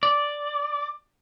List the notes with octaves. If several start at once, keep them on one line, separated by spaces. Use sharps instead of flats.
D5